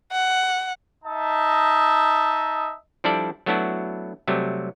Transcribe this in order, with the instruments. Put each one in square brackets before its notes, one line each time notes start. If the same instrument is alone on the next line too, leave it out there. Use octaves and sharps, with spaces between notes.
[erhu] F#5
[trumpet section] D#4 D#5 E5 A5
[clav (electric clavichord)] F3 G3 D4 E4 A4 D5
F#3 A3 B3 D4 E4 F#4
C3 F#3 G3 A3